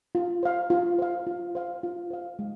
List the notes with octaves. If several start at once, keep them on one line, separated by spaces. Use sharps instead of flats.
F4
C5 F5
F4
C5 F5
F4
C5 F5
F4
C5 F5
G#3